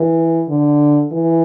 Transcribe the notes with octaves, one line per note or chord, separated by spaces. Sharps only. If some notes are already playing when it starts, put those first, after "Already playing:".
Already playing: E3
D3
E3